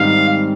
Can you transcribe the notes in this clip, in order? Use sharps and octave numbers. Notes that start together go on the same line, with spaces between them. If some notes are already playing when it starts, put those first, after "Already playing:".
Already playing: G#2 D#3 G3 C4 D#4 F5